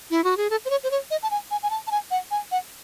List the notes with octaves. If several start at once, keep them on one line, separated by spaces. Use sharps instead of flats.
E4
F#4
G#4
A4
C5
C#5
C5
C#5
D#5
A5
G#5
G#5
G#5
A5
A5
G#5
F#5
G#5
F#5